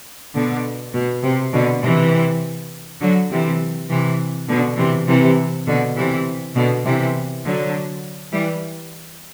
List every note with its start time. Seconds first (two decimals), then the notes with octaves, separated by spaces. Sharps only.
0.35 B2 D3
0.93 B2
1.23 C3
1.53 B2 D3
1.82 C3 E3
3.00 D3 F#3
3.30 C3 E3
3.89 C3 E3
4.48 B2 D3
4.77 C3 E3
5.07 C3 E3
5.66 B2 D3
5.96 C3 E3
6.55 B2 D3
6.85 C3 E3
7.43 D3 F#3
8.33 E3 G3